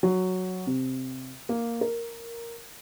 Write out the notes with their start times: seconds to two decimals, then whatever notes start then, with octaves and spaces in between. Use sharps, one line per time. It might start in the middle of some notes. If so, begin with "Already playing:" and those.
0.03 F#3
0.67 C3
1.49 A#3
1.81 A#4